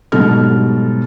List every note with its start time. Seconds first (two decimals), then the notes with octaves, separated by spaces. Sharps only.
0.12 G#2 B2 F#3 G3 A4 F6